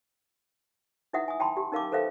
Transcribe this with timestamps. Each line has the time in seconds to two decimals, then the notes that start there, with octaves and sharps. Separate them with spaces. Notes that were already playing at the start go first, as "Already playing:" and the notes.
1.13 D#4 E4 B4 E5 F#5 D#6
1.28 G#5 D#6
1.40 G5 A5 B5 C6
1.57 G4
1.72 C#4 D#4 A#4 F5 A5 D6
1.92 A4 B4 C5 E5 F5 G5